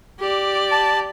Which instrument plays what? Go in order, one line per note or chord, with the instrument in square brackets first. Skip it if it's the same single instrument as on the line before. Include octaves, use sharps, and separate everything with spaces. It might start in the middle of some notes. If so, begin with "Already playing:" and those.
[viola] G4 D5
[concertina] A5